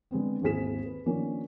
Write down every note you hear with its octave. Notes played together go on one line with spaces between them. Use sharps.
D3 G#3 B3 C4
G#1 D#2 E4 G#4 B6 E7
B4
D#3 F3 A#3 C#4 D4